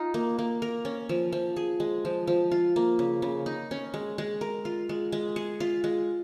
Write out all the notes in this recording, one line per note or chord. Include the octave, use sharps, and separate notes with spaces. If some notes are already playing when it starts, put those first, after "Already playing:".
Already playing: D#4 F4
A#3
A#3
A#4
C#4
F3
F3
G#4
G#3
F3
F3
F4
A#3
C#3
C#3
D#4
C#4
G#3
G#3
A#4
F4
G#3
G#3
G#4
F4
G#3